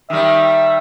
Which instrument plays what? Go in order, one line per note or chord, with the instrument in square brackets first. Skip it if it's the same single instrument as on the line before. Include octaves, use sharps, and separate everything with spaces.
[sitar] D#3 G3 [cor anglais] E5